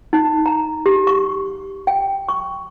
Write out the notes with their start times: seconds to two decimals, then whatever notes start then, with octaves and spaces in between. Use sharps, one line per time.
0.13 D#4
0.46 A#5
0.86 G4
1.07 C#6
1.87 G5
2.29 C#6